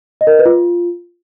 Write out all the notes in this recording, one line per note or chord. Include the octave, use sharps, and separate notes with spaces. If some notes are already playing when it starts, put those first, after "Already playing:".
D#5
A#4
D#5
B4
F4